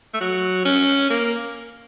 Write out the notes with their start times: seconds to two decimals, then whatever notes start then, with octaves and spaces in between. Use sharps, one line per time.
0.14 A3
0.21 F#3
0.65 C#4
1.10 A#3